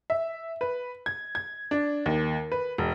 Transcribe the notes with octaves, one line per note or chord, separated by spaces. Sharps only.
E5
B4
G#6
G#6
D4
D#2
B4
E1